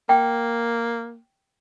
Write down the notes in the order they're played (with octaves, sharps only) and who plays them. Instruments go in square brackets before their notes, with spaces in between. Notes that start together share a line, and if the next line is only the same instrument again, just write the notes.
[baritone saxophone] A#3 [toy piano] G5